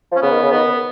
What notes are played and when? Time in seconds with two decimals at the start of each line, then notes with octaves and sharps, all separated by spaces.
0.12 F3
0.16 C#4
0.22 C#3 B3
0.32 D#3
0.42 C#3
0.51 D#3 B3